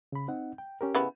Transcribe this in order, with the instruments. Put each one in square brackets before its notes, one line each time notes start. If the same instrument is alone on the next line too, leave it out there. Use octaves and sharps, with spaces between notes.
[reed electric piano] C#3 B5
C4 D#4 F#5
G5
C#4 G4 A#4
[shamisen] C#3 B3 E4